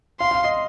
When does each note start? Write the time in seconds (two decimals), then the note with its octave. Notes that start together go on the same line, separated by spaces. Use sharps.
0.20 F5 C6
0.31 F5
0.44 D#5